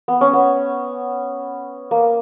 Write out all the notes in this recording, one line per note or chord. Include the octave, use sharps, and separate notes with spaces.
B3
C#4
B3
A#3